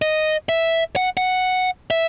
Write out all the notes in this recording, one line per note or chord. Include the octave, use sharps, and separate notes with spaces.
D#5
E5
F#5
F#5
E5